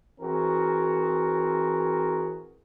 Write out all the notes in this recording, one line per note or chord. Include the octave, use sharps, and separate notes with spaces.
E3 C4 F#4 G#4 A#4